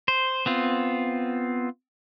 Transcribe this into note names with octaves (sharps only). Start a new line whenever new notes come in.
C5
B3 C4 F4